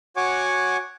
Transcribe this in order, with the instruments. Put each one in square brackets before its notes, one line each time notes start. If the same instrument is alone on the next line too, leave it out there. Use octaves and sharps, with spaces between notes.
[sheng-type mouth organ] F#4 C#5 F#5 G#5 C#6 D6